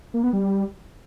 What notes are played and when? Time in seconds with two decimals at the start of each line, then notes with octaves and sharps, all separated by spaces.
0.14 A#3
0.23 B3
0.33 G3